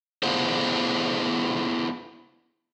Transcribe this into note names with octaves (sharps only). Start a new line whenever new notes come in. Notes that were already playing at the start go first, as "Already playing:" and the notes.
B3 D4 E4 F4 G#4 C5